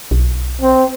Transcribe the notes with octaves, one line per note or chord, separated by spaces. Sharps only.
B1
C4